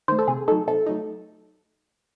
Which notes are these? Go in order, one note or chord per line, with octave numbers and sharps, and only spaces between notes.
D#3 A3 C5
A4
C3 G#4
F#3 A3 D#4 A4
C3 A4
F#3 A3 D#4